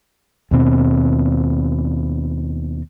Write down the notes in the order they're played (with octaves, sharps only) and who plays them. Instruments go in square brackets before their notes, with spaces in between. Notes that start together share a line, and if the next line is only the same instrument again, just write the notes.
[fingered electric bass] D#2 B2 C4